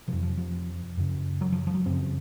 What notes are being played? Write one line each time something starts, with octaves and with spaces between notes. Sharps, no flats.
F2 C3 F3
F3
F3
F#2 C#3
F#3
F3
F3
F#3
F#2 C#3 C4